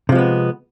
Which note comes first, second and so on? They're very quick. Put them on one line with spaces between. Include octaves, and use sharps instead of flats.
C3 F3 G#3 B3